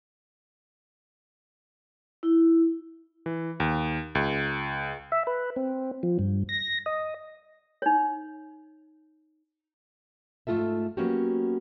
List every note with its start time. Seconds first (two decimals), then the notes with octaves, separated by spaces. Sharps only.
2.23 E4
3.26 E3
3.60 D#2
4.15 C#2
5.12 E5
5.27 B4
5.56 C4
6.03 F3
6.19 G2
6.49 A#6
6.86 D#5
7.82 D#4 C#5
10.47 G#2 A3 E4 F4 A4 E5
10.97 F#3 A#3 B3 C#4 F#4 G4